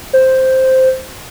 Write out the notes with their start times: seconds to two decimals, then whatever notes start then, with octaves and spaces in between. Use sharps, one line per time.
0.13 C5